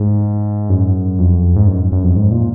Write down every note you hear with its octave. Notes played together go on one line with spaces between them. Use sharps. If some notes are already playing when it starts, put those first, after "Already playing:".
Already playing: G#2
F#2
F2
G#2
F#2
F#2
F2
G#2
A#2